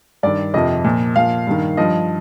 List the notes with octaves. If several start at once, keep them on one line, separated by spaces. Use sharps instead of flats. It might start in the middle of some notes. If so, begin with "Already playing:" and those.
G2 D#3 D5
F2 C3 F3 D#5
A#2 F3
A#2 F3 F5
G2 D#3
G2 F3 D#5